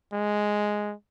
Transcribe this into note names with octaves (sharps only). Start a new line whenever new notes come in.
G#3